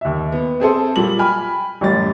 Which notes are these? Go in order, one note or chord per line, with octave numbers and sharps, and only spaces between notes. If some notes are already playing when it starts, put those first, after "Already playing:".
D#2 E5
B3
C4 G#4 A4 C5
A#2 F#3 G3 F4 F#7
G5 G#5 B5 F6
A1 F#2 G3 A6